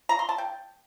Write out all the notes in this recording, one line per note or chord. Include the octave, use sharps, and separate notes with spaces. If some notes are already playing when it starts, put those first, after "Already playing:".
A#5
C6
A5
G5